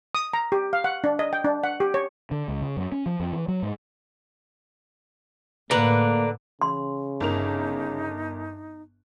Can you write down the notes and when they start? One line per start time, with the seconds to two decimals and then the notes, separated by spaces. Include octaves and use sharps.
0.15 D#6
0.33 A#5
0.52 G4
0.73 F5
0.84 F#5
1.04 D4
1.19 D#5
1.33 G5
1.44 D4
1.64 F#5
1.80 G4
1.94 C#5
2.31 D3
2.48 C#2
2.62 C#3
2.77 F#2
2.92 C#4
3.06 F3
3.20 F2
3.32 E3
3.48 F#3
3.62 G#2
5.71 A2 D3 A#3 B4 D5 A#5
6.62 C#3 C6
7.20 G1 D#4 A#4 F7